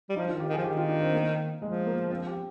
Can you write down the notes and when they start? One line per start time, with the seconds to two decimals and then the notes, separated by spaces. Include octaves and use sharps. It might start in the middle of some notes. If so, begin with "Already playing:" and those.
0.09 G3
0.15 F3 D#4
0.28 F4
0.32 D#3
0.40 G4
0.48 D#3 G#4
0.57 F3
0.64 D#3 G4
0.77 F4
0.89 D4
1.01 C4
1.13 A#3
1.62 F3 G#3
1.86 A#3
2.10 C4
2.27 G4